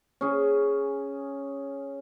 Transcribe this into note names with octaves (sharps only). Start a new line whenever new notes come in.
C#4 G#4